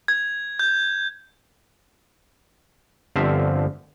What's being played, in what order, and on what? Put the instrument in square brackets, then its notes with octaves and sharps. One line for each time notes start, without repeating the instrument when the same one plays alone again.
[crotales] G#6
G6
[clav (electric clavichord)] G1 D3 F3 C4 E5 F5